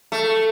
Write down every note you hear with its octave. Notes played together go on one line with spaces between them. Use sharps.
A3